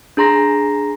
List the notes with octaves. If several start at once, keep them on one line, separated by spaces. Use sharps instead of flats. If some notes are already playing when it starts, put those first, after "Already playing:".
D4 G#4 A#5 C6 A#6